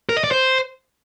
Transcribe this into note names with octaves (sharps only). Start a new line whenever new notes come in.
A#4
D#5
D5
C5